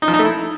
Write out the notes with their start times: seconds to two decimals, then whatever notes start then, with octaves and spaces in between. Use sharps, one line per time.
0.02 D#4
0.08 F3
0.14 D#4
0.19 A3
0.25 E4